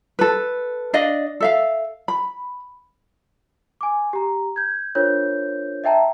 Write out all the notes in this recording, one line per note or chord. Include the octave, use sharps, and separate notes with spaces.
A4 B4
D4 D5 D#5 F5
A4 E5 F5
B5
G#5 D6
G4 A#5
G6 G#6
D4 F4 A#4 C5 C#5 G6
D#5 E5 G5 A5 A#5